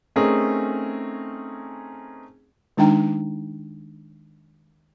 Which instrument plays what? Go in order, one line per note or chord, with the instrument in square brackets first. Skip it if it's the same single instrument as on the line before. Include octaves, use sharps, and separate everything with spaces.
[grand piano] A3 C4 C#4 D#4 G#4 A#4
[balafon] D#3 G#3 D4 D#4 G5 A#5